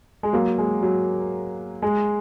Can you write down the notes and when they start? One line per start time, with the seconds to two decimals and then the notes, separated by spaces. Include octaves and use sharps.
0.23 G#3
0.33 F#3 A#3
0.58 G#3
0.83 F#3
1.82 G#3